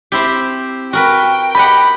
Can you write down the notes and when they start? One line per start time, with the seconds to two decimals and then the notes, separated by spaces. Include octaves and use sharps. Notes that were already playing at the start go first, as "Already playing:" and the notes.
0.12 C4 E4 G4
0.93 F#4 A#4 B4 G5
1.55 G4 D#5 F#5 B5